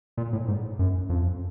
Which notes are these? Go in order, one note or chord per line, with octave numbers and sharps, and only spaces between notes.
A#2
A2
G#2
F#2
F2